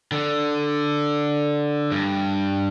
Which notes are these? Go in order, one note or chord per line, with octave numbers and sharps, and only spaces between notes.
D3
G2